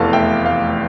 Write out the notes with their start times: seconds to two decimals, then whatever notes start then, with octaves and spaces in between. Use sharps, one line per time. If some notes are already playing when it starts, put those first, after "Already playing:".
Already playing: F1 E2 E3 A3 F5 A5
0.13 E5 G5
0.45 F5